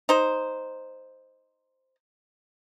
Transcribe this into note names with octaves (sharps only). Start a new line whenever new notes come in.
D#4 C5